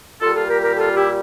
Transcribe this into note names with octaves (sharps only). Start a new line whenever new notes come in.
A#2 G3 F4 A4
F4 A4
G4 A#4
G4 A#4
F4 A4
E4 G4